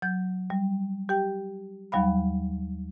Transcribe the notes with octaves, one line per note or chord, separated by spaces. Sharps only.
F#3 G6
G3
G4 G5
D#2 F#3 G3 F5 B5